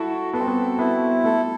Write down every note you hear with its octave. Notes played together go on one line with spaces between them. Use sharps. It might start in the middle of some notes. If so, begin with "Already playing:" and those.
Already playing: E4 F#4 A4
B3 A4
C4
B3
B3 E4
A3 A4